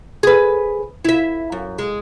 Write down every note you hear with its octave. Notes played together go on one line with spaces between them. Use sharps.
G#4 B4
E4 E5
F#2
G#3